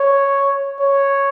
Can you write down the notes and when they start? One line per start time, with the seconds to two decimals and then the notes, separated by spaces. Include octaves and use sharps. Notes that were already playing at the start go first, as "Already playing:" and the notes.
Already playing: C#5
0.79 C#5